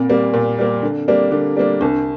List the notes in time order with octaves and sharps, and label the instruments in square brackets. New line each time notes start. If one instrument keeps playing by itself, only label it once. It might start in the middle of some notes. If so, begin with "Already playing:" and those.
Already playing: [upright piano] A#2 [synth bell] C4
[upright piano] G3 A#3
A#2
G3 A#3
D3
G3 A#3 D4
D3
G3 A#3 D4
[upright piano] C2 [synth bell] D4